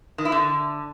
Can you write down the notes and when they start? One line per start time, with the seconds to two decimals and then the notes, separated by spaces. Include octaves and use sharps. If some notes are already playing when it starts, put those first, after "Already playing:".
0.18 D#3
0.25 E4
0.32 D3